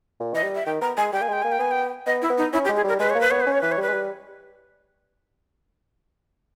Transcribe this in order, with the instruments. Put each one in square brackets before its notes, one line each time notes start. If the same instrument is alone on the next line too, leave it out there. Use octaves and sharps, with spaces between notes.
[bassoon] A#2
[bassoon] E3 [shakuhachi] D#5
[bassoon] G3
[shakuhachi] E5
[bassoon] D#3 [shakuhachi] G5
[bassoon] B3 [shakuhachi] A#5
[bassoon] G#3 [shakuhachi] G#5
[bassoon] G3 [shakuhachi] G5
[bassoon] A#3 [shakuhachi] G#5
[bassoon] G#3 [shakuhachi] G5
[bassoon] A#3 [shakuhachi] G#5
[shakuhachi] G5
[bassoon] B3 [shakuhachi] G#5
[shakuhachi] G5
[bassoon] B3 [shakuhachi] D#5
[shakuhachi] E4
[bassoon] B3
[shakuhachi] D#4
[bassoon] C#4 [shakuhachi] E4
[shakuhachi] G4
[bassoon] G#3
[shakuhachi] G#4
[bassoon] G3 [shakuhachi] A#4
[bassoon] G#3 [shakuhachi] B4
[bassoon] A#3 [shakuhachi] C#5
[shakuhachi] B4
[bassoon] B3 [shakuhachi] C#5
[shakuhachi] B4
[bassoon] C#4
[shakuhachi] C#5
[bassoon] E3 [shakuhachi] B4
[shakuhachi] C#5
[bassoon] G3 [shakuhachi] B4
[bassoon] G#3
G3